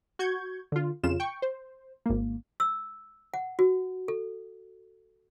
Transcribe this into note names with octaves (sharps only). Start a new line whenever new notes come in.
F#4 C#6 G6 G#6
D3 F4
F2 C#3 F4 E7
G5 C#6
C5
G#1 A#3
E6
F#5
F#4
A4